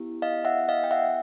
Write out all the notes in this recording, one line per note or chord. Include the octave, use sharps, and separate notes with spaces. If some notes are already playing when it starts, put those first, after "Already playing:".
Already playing: B3 E4 G4
D#5 F5
E5 F#5
D#5 F5
G5
E5 F#5